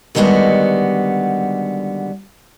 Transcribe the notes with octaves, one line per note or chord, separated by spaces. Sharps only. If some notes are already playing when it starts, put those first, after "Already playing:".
D3 D#3 G3 G#3 B3 F#4